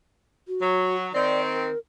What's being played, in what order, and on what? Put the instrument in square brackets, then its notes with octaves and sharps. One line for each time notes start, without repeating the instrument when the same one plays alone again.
[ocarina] F#4
[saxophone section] F#3
[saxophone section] D#3 C4 [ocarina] D5
[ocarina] A#4